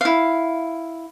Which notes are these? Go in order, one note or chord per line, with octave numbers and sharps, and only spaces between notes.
E4 F5